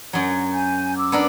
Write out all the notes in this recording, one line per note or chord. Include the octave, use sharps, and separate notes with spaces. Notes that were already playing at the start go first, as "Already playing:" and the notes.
F#2 F#3
G#5 G6
D6 E6
B3 D4 A#4